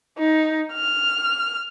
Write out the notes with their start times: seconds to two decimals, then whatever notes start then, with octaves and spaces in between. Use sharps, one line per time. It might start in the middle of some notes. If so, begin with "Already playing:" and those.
0.18 D#4
0.73 F6